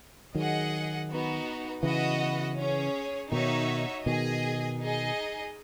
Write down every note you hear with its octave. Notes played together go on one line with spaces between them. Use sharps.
D#3 F#3 G#4 D#5 F#5
B3 D#4 F#4
C#3 E3 B3 F#4 B4 D#5 F#5
C#4 G#4 C#5
B2 D#3 D#4 F#4 C#5 E5
B2 D#3 G#4 D#5 G#5
D#4 G#4 D#5